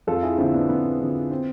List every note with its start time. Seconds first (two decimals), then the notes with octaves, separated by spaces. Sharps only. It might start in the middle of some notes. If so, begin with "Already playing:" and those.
0.07 F2 F4 A4
0.23 E4 G#4
0.38 D3 F3 C4 E4
0.54 B3 D4
0.69 F2 B3
1.01 D3 F3
1.31 C4